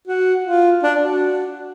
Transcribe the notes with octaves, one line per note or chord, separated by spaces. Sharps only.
F#4
F4
D4
F#4